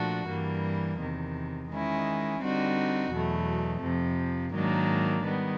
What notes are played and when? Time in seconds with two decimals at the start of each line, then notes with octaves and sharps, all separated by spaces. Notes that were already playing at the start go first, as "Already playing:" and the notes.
Already playing: A#2 F3 A3 D4 F#4
0.27 G2 E3 G3 A#3
0.99 E2 C3 D#3
1.70 D#3 G#3 C#4 E4
2.41 D3 G3 C4 D#4 F#4
3.11 E2 B2 F#3 A3
3.82 F2 C3 F3
4.54 G#2 D#3 F#3 A#3 D4
5.25 D#3 G3 B3